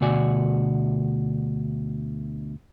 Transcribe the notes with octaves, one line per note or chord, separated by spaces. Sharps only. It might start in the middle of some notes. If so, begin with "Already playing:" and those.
D2 B2 F#4 D5 G#5